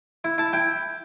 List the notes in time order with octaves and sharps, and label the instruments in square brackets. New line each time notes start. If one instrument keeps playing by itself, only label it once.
[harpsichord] E4
E4 A5
E4 G5